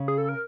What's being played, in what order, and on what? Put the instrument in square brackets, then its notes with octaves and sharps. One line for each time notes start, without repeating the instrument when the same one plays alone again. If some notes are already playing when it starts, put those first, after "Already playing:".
Already playing: [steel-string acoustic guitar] C#3
[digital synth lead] G#4
A4
A#4